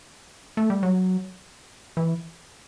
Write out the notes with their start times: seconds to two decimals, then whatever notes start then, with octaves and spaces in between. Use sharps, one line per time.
0.57 A3
0.70 G3
0.83 F#3
1.97 E3